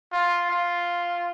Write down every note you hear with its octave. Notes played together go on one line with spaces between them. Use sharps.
F4
F4